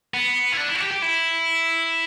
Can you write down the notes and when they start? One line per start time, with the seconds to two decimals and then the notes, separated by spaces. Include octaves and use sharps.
0.14 B3
0.52 E4
0.57 D4
0.68 E4
0.75 F#4
0.80 G4
0.91 G4
1.02 E4